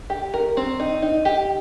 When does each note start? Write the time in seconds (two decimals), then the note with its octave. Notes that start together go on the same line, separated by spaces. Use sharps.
0.10 G4
0.34 A#4
0.57 C4
0.80 D#4
1.02 D#4
1.25 G4